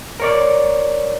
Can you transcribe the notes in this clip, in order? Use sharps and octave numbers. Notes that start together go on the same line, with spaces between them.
A#4 C#5 D5